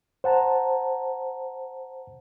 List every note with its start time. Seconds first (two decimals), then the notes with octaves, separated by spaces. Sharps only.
0.24 C5 F#5 A5 A#5